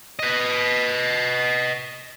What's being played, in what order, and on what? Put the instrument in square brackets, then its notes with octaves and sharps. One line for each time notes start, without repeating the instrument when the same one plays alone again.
[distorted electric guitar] B4 D#5